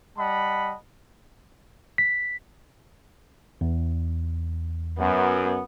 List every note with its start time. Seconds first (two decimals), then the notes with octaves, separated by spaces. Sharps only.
0.18 G3 D#5 F#5 A5 B5
1.98 B6
3.61 E2
4.99 F#2 B3